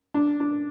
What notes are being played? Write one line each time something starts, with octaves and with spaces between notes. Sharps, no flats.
D4
D4